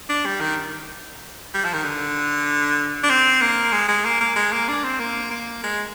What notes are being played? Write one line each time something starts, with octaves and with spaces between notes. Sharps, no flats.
D4
G3
D#3
G3
F3
D#3
D3
D4
C4
A#3
G#3
G#3
A#3
A#3
G#3
A#3
D4
C4
A#3
A#3
G#3